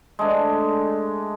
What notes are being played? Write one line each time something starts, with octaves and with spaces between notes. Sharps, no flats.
G#3 A3 D4